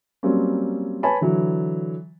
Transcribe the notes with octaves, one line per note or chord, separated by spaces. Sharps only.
F#3 G3 A#3 C4 C#4
B4 C#5 G#5 A5 B5
D3 E3 F#3